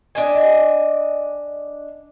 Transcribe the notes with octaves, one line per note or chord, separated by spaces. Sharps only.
D4 D#5 G#5